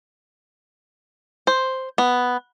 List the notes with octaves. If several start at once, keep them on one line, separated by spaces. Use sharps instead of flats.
C5
B3